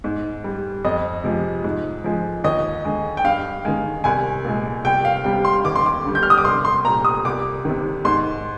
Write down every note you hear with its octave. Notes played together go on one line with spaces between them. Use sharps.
G#2
G3
F2 D#5
C3 F3 G#3
G#2
F3 G#3
D#2 D#5
D3 G#3
G5
G2 F5
D#3 G#3
C2 G#5
A#2 G#3
C2 G5
F5
C3 G3 G5
C6
D#2 D6
C6
D6
D3 G3
G6
F6
D#6
D6
C2 C6
C6
A#2 G3 A#5
D#6
C2 D6
C3 D#3
G#2 C6